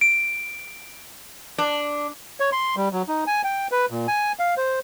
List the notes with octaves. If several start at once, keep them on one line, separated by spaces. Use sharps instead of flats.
D7
D4
C#5
C6
G3
F#3
D#4
G#5
G5
B4
A#2
G#5
F5
C5